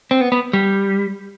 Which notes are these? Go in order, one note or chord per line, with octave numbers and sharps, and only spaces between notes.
C4
B3
B3
G3